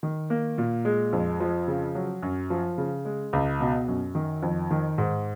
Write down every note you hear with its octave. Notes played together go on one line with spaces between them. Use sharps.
D#3
A#3
A#2
G#3
F2
F3
C#3
F#3
F#2
F3
C#3
G#3
C#2
B2
F#2
D#3
F2
D#3
G#2